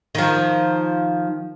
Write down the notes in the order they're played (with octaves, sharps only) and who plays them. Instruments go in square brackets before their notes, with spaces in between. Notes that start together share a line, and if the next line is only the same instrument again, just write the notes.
[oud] D#3 F3